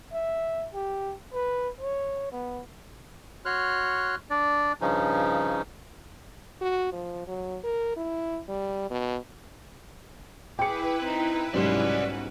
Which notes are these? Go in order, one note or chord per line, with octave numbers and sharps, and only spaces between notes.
E5
G4
B4
C#5
B3
F#4 C#5 C6 F6 F#6
D4 D5
G2 C#3 F3 C#4 D#4
F#4
F3
F#3
A#4
E4
G3
B2
E4 G#4 B4 G5 D6 C#7
C4 D#4
B1 G#2 G3 C#4 F#4 D5 C6